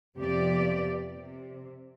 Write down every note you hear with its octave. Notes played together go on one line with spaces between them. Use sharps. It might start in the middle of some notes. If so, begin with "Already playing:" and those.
F2 C3 F3 B3 G4 D5
C3